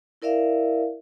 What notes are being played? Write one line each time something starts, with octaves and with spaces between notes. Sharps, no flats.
E4 A#4 D5 E5 F5